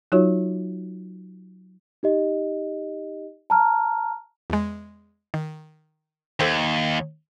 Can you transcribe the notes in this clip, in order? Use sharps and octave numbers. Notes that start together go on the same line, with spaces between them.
F#3 D#4 F4 F#4 C#5
D#4 G4 D#5
A5 A#5 F6
E2 G#3
D#3
D#2 A4 C5 G5